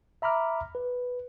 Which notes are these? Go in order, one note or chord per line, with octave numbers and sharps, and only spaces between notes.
E5 A#5 B5 D6 F6
B4